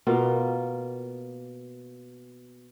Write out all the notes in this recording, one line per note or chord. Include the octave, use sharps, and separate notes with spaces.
B2 A#3 F4